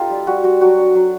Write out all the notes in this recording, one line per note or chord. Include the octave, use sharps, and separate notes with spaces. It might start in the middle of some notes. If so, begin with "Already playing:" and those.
Already playing: C4 D#4 F4 G4 A4
G3
G3 F#4
G3 F#4
F#3 F#4
D4
F#3